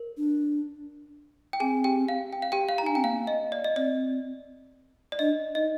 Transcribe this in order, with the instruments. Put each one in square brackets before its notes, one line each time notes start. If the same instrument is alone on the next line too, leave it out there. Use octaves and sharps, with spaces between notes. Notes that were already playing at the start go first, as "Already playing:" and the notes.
Already playing: [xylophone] A#4
[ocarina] D4
[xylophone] G5
[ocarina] C4 [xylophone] G#4 G#5
[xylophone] G4 G5
F5
G5
F5
G4 G5
F5
A#5
[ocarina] D#4
[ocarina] D4 [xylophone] G#5
[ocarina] C4 [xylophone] G5
[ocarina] A#3 [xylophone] F5
[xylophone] D#5
D5
D#5
[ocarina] C4 [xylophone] D5
[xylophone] D5
[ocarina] D4 [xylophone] D#5
[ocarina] D#4 [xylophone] D#5